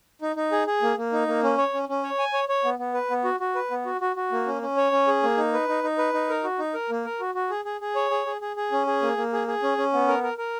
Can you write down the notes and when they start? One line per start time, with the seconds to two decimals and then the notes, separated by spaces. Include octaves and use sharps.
0.22 D#4
0.36 D#4
0.52 G#4
0.67 G#4
0.82 A#3
0.97 A#3
1.13 D#4
1.27 A#3
1.43 C#4
1.58 C#5
1.74 C#4
1.89 C#4
2.03 C#5
2.19 G#5
2.33 C#5
2.49 C#5
2.64 B3
2.79 B3
2.94 B4
3.10 B3
3.24 F#4
3.40 F#4
3.55 B4
3.71 B3
3.86 F#4
4.01 F#4
4.16 F#4
4.32 A#3
4.46 C#4
4.62 C#4
4.76 C#5
4.92 C#4
5.07 G#4
5.23 A#3
5.37 D#4
5.53 B4
5.68 D#4
5.84 D#4
5.98 B4
6.14 D#4
6.29 A#4
6.44 F#4
6.59 D#4
6.74 A#4
6.90 A#3
7.05 A#4
7.20 F#4
7.35 F#4
7.50 G#4
7.65 G#4
7.81 G#4
7.96 C#5
8.11 G#4
8.26 G#4
8.41 G#4
8.56 G#4
8.72 C#4
8.87 G#4
9.02 A#3
9.17 A#3
9.33 G#4
9.48 G#4
9.63 C#4
9.78 C#4
9.93 B3
10.08 A#4
10.23 A#4
10.38 A#4